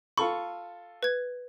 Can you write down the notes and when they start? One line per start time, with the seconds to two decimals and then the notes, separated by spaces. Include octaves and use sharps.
0.18 F4 A4 B5 C#6
1.03 B4 G#6